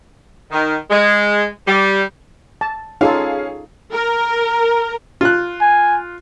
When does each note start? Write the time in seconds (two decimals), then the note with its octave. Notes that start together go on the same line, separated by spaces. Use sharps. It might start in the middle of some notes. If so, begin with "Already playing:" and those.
0.52 D#3
0.90 G#3
1.67 G3
2.61 A5
3.01 C#4 D#4 F4 G#4 A4 F5
3.93 A#4
5.21 F4 F#6
5.61 G#5